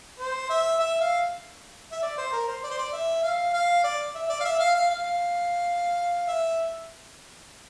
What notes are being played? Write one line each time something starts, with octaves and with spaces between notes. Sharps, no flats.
C5
E5
E5
F5
E5
D5
C5
A#4
C5
D5
C5
D5
E5
F5
F5
D5
E5
D5
F5
E5
F5
F5
F5
E5